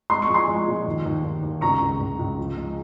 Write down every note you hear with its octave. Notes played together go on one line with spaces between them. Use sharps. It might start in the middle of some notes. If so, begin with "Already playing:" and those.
G#3 C6
C#6
F3
G#5 C6
G#3
A#2
D#2
D#2
D#2
D#2
C#2 A#5 C#6
C#2
C#2
C#2
F3
G#3